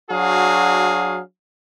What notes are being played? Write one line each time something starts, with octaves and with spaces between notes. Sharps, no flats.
F#3 D4 F#4 G#4 F5